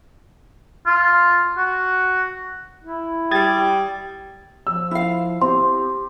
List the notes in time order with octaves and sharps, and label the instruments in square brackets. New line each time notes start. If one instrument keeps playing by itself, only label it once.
[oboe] F4
F#4
[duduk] E4
[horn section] G3 [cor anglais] G5 [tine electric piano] D#6 G#6 A6
[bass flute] F3 [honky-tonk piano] E6
[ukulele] E4 F5
[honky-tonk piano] C4 [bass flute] G4 [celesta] C6